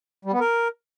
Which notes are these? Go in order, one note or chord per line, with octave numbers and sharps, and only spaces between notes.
G3
B3
A#4